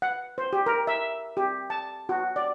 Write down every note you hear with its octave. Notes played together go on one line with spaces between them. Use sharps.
F#5
C5
G4
A#4
E5
G4
A5
F#4
D5